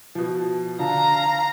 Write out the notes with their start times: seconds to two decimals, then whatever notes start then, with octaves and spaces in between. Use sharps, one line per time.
0.15 B2 F3
0.79 D3 F5 A5 A#5